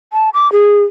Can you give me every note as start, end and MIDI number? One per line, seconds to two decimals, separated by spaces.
0.13 0.30 81
0.34 0.51 86
0.52 0.84 68